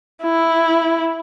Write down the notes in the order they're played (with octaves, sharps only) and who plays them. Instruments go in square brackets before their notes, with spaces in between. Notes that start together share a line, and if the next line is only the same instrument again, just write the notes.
[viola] E4